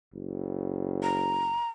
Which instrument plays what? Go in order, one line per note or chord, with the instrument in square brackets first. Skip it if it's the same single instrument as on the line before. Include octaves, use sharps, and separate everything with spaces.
[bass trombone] F#1
[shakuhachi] A#5